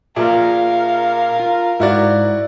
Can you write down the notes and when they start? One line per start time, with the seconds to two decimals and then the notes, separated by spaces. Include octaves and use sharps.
0.16 A#2 G#4 A#4 D5 E5 F5
1.40 F4
1.80 G#2 E4 F#4 D5